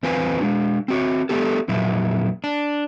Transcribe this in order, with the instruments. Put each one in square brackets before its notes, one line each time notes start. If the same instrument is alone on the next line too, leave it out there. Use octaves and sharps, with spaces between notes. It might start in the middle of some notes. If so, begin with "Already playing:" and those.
[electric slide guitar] E2 C4 F4 B4 G#5
G#3 D4
C4 F#4 C#5
A3 B3 G4 A4
F2 A#2 F#3 E4
D4